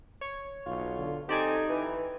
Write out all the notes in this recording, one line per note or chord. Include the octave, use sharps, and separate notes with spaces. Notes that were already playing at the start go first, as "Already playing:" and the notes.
C#5
B1 F4
D3
C4 D#4 G4 A4 D5 G#5
E3 B4